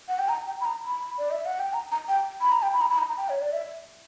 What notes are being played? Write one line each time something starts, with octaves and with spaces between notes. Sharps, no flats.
F#5
G5
A#5
G5
B5
A#5
B5
D5
E5
F#5
G5
A#5
A#5
G5
B5
A#5
G5
B5
A#5
B5
A#5
A#5
G5
C#5
D5
E5